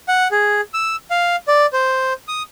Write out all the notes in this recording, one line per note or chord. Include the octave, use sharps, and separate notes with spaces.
F#5
G#4
E6
F5
D5
C5
D#6